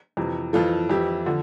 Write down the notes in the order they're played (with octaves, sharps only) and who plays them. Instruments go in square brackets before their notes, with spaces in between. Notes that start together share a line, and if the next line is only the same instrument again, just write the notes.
[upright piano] F2 C3 E3
F2 E3 F4 A4
F2 E3 E4 G4
D3 F3